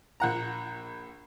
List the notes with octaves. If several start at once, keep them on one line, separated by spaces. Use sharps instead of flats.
A#1 F#5 A#5